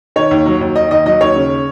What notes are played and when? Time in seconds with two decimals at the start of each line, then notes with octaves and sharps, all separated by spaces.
0.16 D#3 C#5
0.31 D#2
0.46 F#3
0.61 D#2
0.75 D#3 D#5
0.91 D#2 D#5
1.06 F#3 D#5
1.21 D#2 C#5
1.35 C#3